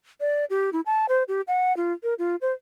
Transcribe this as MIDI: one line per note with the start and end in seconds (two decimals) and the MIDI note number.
0.21 0.45 74
0.50 0.70 67
0.73 0.81 64
0.86 1.06 81
1.09 1.23 72
1.28 1.41 67
1.48 1.75 78
1.77 1.93 65
2.03 2.14 70
2.19 2.36 65
2.41 2.53 72